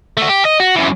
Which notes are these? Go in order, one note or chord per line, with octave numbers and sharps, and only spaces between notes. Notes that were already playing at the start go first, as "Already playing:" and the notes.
A3 F#4
G4
D#5
F#4
F#2 E3